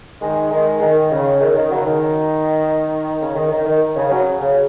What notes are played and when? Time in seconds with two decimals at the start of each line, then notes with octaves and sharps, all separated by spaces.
0.21 D#3 G#3
0.51 D#3 G#3
0.81 D#3
1.12 C#3
1.41 D#3
1.56 D#3
1.71 C#3 F#3
1.87 D#3
3.22 C#3
3.36 D#3
3.51 D#3
3.66 D#3
3.96 C#3
4.11 C#3 F#3
4.41 C#3